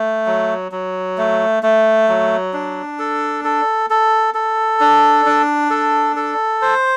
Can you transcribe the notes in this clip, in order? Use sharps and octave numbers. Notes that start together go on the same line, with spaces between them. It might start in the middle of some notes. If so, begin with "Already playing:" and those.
Already playing: A3
F#3
F#3
A3
A3
F#3
D4
A4
A4
A4
A4
D4
D4
A4
A4
C5